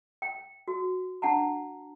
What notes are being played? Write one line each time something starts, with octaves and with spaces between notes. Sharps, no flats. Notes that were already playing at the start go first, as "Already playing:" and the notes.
G5
F#4
D4 F#5 A5 A#5